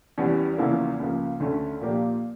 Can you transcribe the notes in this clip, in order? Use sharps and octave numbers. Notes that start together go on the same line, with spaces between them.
E2 E3 G3 C#4
E2 C#3 F3 A#3 E4
C#2 C#3 F3 A#3
D2 D3 A3 C#4
A#2 F3 A#3 D4 G4